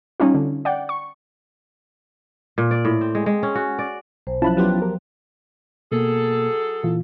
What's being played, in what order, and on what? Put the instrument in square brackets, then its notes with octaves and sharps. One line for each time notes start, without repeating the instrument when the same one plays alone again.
[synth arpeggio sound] G3 C#4 D#4 F4
D3
D5 F#5 G5
C#6
[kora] A#2
D5
A2
C4
G#3
G#3
C#4
F#4
D5
[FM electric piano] B1 [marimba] C5
[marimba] F3 F#3 [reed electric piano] C#4 E4 F4 [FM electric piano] A5 B5 F#6
[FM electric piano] F#3 B3 G4 [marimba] C6 F#6
[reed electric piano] A#4
[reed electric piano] B2 A#3 [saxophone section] F#3 G#4 A4
[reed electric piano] A#2 E3 F4